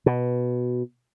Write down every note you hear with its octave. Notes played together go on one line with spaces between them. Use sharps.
B2